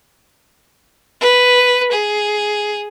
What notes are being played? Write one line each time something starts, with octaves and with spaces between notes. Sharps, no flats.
B4
G#4